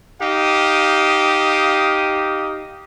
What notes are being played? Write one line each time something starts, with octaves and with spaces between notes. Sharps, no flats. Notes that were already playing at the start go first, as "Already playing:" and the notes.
D#4 G4 F5 D#6